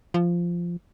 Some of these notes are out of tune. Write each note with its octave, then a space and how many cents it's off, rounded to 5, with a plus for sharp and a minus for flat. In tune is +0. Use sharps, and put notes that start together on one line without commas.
F3 -10